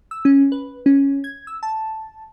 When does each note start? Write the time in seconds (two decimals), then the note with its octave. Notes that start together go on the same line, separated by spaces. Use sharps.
0.11 E6
0.25 C#4
0.52 B4
0.86 C#4
1.24 G#6
1.47 E6
1.63 A5